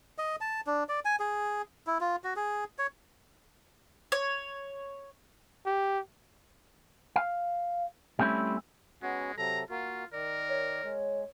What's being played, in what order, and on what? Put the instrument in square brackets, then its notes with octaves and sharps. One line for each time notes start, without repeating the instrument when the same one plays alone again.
[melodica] D#5
A5
D4
D5
G#5
G#4
E4
F4
F#4
G#4
C#5
[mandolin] C#5
[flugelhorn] G4
[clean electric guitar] F5
G3 A3 C4 C#4 E4
[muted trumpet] G#3 [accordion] B3 C#4 F#4
[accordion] C3 F#3 A4 [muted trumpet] A#5
[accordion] A#3 F#4 A#4 [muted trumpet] F4
[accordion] D#3 D5 [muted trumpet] A#4
[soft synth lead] C#5
[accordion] G#3